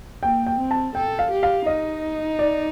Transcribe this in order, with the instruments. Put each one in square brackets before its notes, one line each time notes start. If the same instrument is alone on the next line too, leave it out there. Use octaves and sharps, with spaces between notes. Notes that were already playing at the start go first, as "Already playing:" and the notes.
[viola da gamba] A#3 [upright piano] G5
[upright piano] G5
[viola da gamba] C4
[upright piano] A5
[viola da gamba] A4 [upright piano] G5
[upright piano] F5
[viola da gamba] G4
[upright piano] F5
[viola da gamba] D#4 [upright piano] D#5
[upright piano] D5